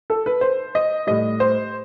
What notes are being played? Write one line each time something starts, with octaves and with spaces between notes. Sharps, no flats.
A4
B4
C5
D#5
A2 G3 D#5
C5